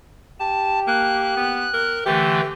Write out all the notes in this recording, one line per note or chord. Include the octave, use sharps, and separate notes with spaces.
G4 A5
A#3 F#6
B3
A#4
D3 E3 A3 G4